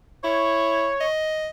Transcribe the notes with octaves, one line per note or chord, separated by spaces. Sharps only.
E4 C#5
D#5